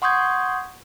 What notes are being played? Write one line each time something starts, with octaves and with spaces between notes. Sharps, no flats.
F#5 C6 C#6 D#6 G6 G#6